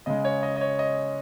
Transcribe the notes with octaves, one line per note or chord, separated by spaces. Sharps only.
C#3 G#3 D#5
C#5
D#5
D#5
C#5
D#5